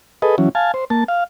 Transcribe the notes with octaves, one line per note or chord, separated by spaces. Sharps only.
G#4 A4 B4 D#5
E3 F#3 C#4
F5 G#5 A5
C5
A#3 A5
F5